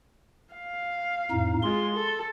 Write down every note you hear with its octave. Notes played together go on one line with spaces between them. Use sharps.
F5
F2 A2 D#4
G#3 F4 C6
A4